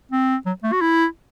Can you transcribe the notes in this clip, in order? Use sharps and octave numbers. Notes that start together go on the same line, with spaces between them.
C4
F#3
A3
F#4
E4